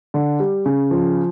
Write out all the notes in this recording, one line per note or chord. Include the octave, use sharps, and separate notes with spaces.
D3
G3
C#3
F3